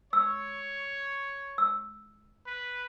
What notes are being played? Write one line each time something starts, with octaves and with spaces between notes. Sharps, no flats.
C#5 E6
E6
B4